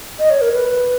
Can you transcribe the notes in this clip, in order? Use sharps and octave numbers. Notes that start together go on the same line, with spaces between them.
D#5
C#5
A#4
B4